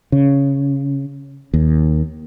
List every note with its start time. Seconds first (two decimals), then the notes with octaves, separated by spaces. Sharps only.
0.12 C#3
1.54 D#2